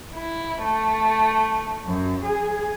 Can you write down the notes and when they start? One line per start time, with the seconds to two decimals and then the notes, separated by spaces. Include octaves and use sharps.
0.14 E4
0.61 A3
1.85 F#2
2.24 G#4